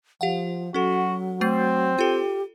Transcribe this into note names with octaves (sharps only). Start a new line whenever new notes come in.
F3 G4 F5 F#5
F#3 C#4 F#4 A4
A3 C4 A6 C7
F4 G4 A4